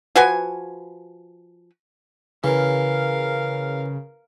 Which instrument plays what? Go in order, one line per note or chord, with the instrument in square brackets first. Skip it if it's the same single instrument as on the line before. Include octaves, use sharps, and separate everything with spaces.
[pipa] F3 F#4 B4 G#5
[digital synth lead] C#3 [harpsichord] E3 [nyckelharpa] A#4 F5